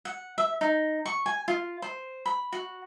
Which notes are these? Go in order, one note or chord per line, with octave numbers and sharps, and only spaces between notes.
F#5
E5
D#4
C#6
G#5
F4
C5
B5
F#4